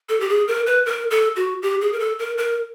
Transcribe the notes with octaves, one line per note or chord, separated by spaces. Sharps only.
A4
G4
G#4
A#4
B4
A#4
A4
F#4
G4
G#4
A#4
A4
A#4
A#4